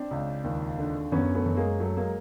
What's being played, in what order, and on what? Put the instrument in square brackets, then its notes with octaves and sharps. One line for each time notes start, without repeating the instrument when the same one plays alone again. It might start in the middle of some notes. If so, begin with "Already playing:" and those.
Already playing: [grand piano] C4 D4
C#2
D#2
D3
F#2 B3 C#4
A3 B3
F#2
G#3 A#3
F#3 A3
G#3 A#3